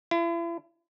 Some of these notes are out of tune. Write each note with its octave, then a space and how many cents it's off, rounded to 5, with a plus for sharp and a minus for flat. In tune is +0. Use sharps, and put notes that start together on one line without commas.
E4 +40